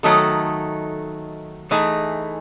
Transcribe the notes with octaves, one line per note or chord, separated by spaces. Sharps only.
D#3 F#3 A3 D#4 A4
E3 A3 D#4 G#4